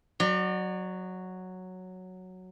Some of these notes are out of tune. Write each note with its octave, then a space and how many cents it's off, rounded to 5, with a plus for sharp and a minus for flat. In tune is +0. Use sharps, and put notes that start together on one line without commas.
F#3 +0 D5 +40